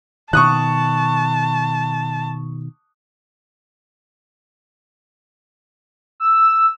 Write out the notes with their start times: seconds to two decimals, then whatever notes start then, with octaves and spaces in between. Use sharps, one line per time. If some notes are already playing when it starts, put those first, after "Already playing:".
0.33 B2 D#3 A5 C#6 D#6 F#6
6.20 E6